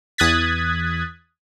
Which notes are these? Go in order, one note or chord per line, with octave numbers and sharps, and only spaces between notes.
E2 D#6 F#6 G#6 A6 B6